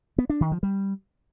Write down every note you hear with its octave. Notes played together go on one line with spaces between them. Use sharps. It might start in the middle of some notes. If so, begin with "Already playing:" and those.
B3
D4
D#3
F3
G3